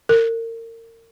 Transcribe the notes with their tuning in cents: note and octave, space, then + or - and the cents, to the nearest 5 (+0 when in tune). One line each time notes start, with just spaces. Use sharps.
A#4 -35